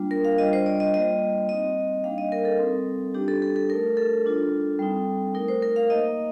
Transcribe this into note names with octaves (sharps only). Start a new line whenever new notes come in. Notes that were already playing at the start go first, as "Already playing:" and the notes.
Already playing: G3 A#3 D4 F4
A#4
F5
G3 D4 F4 D#5
C5
D5
D#5
G3 A#3 F4 D#5
G3 C4 D#4 D#5
G3 A#3 D4 F5
D#5
A#4
A4
G3 C4 D#4
G3 D4 F4 G4
A4
A4
A4
A3 D#4 A#4
A4
G3 D4 F4
G3 C4 D#4
A3 D#4 A#4
C5
A#4
F5
A#3 D#4 D#5